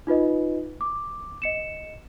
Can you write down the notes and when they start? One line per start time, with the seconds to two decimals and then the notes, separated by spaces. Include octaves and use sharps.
0.07 D#4 F4 B4 D#5
0.81 D6
1.42 D#5 C#7 E7